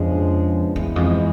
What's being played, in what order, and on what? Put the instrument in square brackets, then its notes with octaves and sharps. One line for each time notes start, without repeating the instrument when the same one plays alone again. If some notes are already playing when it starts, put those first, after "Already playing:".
Already playing: [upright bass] F2 [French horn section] C#3 F3 G#3 B3 D4
[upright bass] E2 [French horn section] E3 G#3 B3
[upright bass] F2